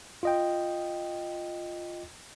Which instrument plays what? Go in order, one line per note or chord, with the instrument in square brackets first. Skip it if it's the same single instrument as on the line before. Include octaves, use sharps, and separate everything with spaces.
[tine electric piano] F4 D#5 G5